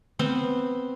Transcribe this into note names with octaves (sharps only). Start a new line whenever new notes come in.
B3 C4 C5